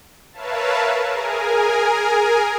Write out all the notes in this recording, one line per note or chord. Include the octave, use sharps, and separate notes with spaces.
A#4 B4 C#5 E5 F5 A5
G#4 A#4 G#5